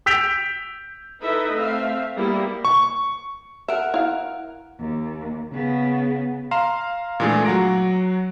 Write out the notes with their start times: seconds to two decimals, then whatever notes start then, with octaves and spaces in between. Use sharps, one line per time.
0.06 E6 G6 B6 D7 F7
1.22 D#4 E4 A4 B4 D#5 E5
1.54 A3 C4 E5 F5
2.16 G3 A#3 B3 E4
2.65 C#6
3.68 A#4 E5 F#5
3.94 E4 F5
4.79 D#2
5.52 C#3 B3
6.51 F5 A#5 C6 E7
7.20 A#2 E3 G#3 A3 D4 G#4
7.45 F#3 F#5 A#5 A#6 D7